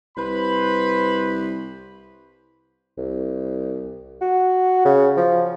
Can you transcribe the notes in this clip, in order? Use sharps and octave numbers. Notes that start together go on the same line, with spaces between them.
C2 B4 C5 B5
C2
F#4
C#3
F3